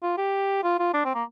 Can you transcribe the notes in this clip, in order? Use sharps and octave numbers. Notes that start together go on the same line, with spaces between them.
F4
G4
F4
F4
D4
C4
A#3